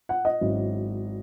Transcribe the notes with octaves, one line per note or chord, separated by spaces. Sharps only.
F#5
D#5
G#1 G#2 F#3 C#4 E4